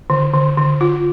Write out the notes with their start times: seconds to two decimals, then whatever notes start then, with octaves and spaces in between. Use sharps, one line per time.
0.10 D3
0.34 D3
0.57 D3
0.81 F4